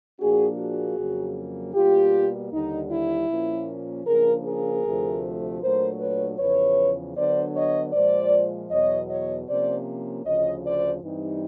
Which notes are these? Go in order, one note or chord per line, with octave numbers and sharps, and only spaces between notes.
A#2 F3 A#3 D4 F#4 G#4
F#4 G#4
F2 C#3 F#3 A#3
B2 G3 A#3 F4 G4
D#2 D3 G3 D#4
E4
A#2 F3 A#3 C#4
C#3 F3 A#3 D4 G#4 A#4
G#4 A#4
D2 C3 F3 A3
A#2 F#3 A3 D4 A#4 C5
B4 C#5
E2 C#3 F3 B4 C#5
D3 F#3 B3 D4 C5 D5
C#5 D#5
A#2 F3 G#3 C5 D5
E2 B2 F#3 C#5 D#5
C#5 D#5
C3 F3 A#3 C#4 C5 D5
D2 C#3 F3 C#5 D#5
C5 D5
G2 E3 G3 C4 D#4